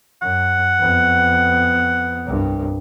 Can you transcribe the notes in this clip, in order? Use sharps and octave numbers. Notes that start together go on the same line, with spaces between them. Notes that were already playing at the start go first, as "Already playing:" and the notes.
F#2 F#5
F2 B3
C2 G2